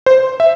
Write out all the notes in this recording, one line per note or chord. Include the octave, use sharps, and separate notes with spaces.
C5
E5